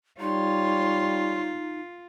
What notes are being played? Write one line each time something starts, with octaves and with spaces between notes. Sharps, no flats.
G3 D#4 F4 C#5 C6